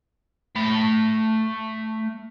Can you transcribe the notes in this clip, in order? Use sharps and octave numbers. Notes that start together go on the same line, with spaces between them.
A3 B5